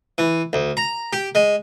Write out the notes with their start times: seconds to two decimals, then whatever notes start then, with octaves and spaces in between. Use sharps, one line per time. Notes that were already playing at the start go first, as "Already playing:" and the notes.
0.18 E3
0.53 D2
0.77 A#5
1.13 G4
1.35 G#3